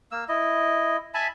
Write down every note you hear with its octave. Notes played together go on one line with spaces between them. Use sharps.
A#3 E6
E4 D#5
E5 G#5 A5 B5